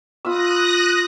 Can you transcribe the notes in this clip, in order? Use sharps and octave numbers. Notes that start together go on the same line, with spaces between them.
F4 B5 D#6 E6 F#6 A#6